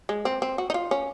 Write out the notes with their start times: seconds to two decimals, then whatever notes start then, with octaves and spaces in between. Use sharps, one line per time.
0.09 G#3
0.25 C4
0.42 C4
0.58 F#4
0.70 D#4
0.74 F4
0.91 C#4